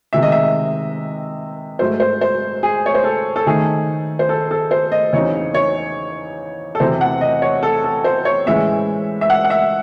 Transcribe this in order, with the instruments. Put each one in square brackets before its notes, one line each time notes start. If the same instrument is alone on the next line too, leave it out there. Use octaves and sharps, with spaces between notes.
[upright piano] C3 D#3 G#3 E5
D#5
E5
G#2 F#3 A3 C5
C5
C5
G#4
C#5
C5
A4
A4
D#3 A3 D#4 G#4
C5
A4
A4
C5
D#5
E2 C#3 F#3 C4 D#4 C#5
C#5
A4
E2 C3 F#3 C5
F#5
D#5
C#5
A4
A4
C5
C#5
A2 E3 G#3 C#4 E5
E5
F#5
F#5
E5